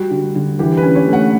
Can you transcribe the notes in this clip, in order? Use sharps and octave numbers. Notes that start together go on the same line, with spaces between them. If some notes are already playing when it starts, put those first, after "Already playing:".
Already playing: G3 F#4
D3
D3
E3 G4
B4
C#4
C#5
A3 F#5